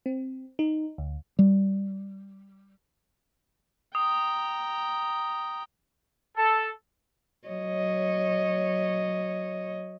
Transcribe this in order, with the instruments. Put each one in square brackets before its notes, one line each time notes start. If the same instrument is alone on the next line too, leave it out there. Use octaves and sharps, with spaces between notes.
[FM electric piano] C4
D#4
D2
[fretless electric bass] G3
[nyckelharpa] G5 A#5 [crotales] D#6
[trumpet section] A4
[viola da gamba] F#3 C#5 D#5